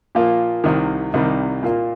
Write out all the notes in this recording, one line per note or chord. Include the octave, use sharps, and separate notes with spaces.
A#2 F3 A#3 F4
C2 C3 D#3
C2 C3 D#3 G3 D#4
A#2 A#3 F4